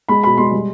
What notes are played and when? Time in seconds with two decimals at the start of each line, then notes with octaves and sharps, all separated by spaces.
0.08 G#3 B5
0.23 B2 B5
0.37 G#3 C6
0.52 G3